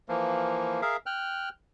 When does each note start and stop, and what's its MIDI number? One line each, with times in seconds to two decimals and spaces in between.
0.09 0.81 52
0.09 0.81 53
0.09 0.81 58
0.82 0.97 68
0.82 0.97 70
0.82 0.97 76
0.82 0.97 77
1.06 1.49 79
1.06 1.49 89
1.06 1.49 90